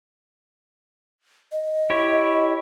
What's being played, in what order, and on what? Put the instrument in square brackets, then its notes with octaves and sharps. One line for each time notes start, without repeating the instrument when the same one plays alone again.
[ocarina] D#5
[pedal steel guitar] E4 G4 C#5